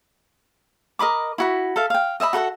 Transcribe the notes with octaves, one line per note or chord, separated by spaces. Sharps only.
A#4 D#5 B5 D6
E4 F#4 B5
A4 E5 F5
F5 G5
D#5 E5 G5 B5
F#4 A4 E5 F#5